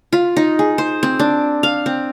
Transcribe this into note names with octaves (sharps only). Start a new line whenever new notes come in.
F4
D#4
G#4
C5
C4
D4
F5
C4